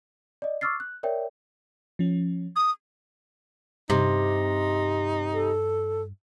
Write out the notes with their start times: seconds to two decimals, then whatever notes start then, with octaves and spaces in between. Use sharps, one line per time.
0.42 D5 D#5
0.61 C#6 D6 E6 F6 A6 C7
0.80 F#6
1.03 A#4 C#5 D5 E5 G5
1.99 F3 C#4
2.56 D#6
3.90 G2 C3 D#4
5.34 A4